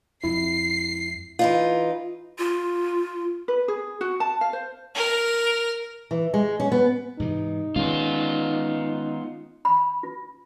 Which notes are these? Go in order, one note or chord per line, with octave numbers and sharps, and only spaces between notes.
F2 G#3 E4 C7
E3 D#4 F4
F4
B4
G#4
F#4
A5
F5
C5
A#4
E3
G#3
C#4
B3
G#2 C3 E3 D#4
D#3 G#3 B3 C#4 F4
B5
F4